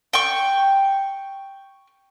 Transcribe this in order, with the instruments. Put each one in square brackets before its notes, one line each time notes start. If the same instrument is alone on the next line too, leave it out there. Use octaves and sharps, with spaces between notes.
[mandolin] G5 C#6